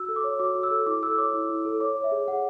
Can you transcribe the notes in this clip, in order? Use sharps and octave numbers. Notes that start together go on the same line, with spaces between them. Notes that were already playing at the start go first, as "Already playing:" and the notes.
Already playing: F#4 E6
A4
D6
C#5
F#4 D6
F#4
E6
A4
E4 D6
A4 E6
C#5 D6
E4
E4
A4
C#5 D6
C#5
E5
G#4
G#4 F#5